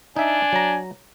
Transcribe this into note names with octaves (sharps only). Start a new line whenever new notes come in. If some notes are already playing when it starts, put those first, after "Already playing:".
D4 D#4 E5 G#5
F#3 A#5